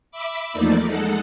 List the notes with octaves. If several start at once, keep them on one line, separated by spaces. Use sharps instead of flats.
E5 B5 D6
E2 F3 A3 A#3 D#4 D5
G#3 D#4 A4 F#5